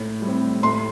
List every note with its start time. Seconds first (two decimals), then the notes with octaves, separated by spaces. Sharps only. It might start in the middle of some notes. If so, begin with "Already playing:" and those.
Already playing: A2
0.22 G3 C4
0.62 A2 C6